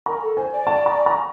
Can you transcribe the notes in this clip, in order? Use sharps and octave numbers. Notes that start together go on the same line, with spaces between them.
A#4 A#5
A4
C5 G#5
D5
A5
A#5
A#5